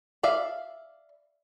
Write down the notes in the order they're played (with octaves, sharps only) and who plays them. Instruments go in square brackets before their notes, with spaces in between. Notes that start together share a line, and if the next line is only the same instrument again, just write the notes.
[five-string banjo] D5 E5 F5